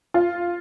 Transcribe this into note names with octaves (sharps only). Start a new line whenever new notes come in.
F4